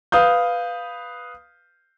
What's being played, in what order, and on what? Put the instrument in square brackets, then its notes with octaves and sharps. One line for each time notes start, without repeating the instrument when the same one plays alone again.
[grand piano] B4 F5 D#6 G6